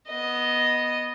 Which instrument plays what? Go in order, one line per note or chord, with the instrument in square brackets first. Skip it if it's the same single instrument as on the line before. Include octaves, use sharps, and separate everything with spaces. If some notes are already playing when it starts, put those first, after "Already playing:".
[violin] B3 D#5